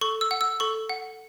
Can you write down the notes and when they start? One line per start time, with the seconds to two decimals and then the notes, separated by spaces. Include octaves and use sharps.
0.01 A4 C#6
0.21 E6
0.31 F#5
0.41 E6
0.60 A4 C#6
0.89 F#5